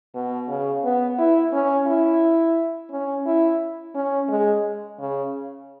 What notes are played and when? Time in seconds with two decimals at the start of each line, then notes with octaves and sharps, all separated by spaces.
0.15 B2
0.48 C#3
0.84 B3
1.19 E4
1.53 C#4
1.87 E4
2.91 C#4
3.26 E4
3.95 C#4
4.30 G#3
4.99 C#3